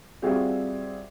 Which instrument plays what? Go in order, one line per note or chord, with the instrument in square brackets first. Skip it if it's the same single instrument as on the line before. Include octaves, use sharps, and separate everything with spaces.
[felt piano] G3 C4 F4 F#4 G#4 E5